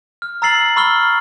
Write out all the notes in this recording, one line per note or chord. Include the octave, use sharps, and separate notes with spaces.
F6
A#5 E6 A6 C7 F#7
B5 C#6 E6 F6 G7